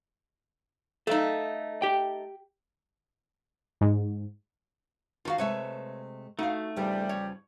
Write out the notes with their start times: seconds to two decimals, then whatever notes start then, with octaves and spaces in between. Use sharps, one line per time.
1.07 A3 D#4 A4 F5
1.82 G4 G5
3.81 G#2
5.25 D#3 D#4 F4 F#4 F5
5.38 C3 G#3 A3 B4 C#5 E5
6.39 A3 D#4 F#4 F5
6.76 E2 C#3 F3 G3
7.09 C#5